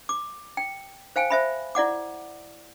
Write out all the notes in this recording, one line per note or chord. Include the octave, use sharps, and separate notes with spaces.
D6
G5
C5 F5 G5 G#5
C5 E5 B5
E4 D5 F#5 D6